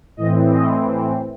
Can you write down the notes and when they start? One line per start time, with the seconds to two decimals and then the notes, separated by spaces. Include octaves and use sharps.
0.17 A2 E3 C4 D#5
0.52 D#5